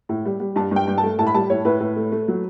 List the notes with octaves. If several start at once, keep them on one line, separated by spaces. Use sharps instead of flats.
A2
G3
G3
G2 A5
G2 G5
G2
A5
A3
A2 A5
B5
G3 A5
A2 C#5
A2 B4
A2
A3
A3
F#3